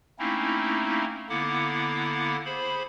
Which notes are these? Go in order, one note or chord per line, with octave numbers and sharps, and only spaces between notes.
A3 A#3 C4 C#4 D#4 E4
D3 A#3 B3 E4 F#5 D6
G#4 C5 B5